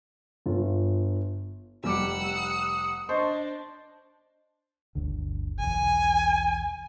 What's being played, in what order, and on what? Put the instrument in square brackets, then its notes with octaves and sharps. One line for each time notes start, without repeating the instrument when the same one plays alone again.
[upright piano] G1 F4
[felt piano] F1 G3 D6 [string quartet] F#5 E6
[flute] D#6
[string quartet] D4 [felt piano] C5 A5 C#6 [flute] D#5
[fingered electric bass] G1 D2 D3
[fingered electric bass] B1 E2 [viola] G#5